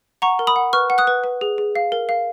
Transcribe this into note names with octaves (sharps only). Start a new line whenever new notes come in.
F#5 A#5 C#6
A#4
B5 D#6
F#5
B4 C#6 F6
F#5
D#6 F#6
B4
B4
G#4
G#4
F5
A#4
F5